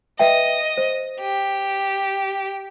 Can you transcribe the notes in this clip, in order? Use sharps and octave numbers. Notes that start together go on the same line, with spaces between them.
B4 D#5 E5 G5
C5
G4